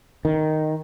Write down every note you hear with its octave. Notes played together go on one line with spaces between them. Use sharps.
D#3